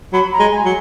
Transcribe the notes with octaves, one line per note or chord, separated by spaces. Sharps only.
F#3 B5
A#5
G#3
G#5
F#3